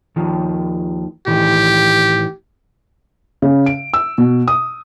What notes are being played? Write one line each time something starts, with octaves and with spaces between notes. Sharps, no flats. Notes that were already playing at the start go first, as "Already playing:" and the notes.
D#2 D#3 F3
A2 D#3 E3 G4
C#3
D7
E6
B2
D#6